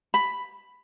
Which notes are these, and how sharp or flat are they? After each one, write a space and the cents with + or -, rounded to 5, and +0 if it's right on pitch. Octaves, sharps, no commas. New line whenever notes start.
B5 +5